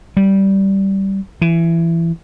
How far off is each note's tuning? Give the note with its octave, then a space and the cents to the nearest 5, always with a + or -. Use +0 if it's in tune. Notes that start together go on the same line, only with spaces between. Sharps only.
G3 -10
E3 +20